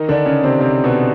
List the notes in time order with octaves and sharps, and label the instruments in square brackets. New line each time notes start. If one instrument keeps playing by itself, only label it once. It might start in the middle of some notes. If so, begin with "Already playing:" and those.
Already playing: [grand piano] D#3 D#4
D3 D4
C#3 C#4
C3 C4
C3 C4
B2 B3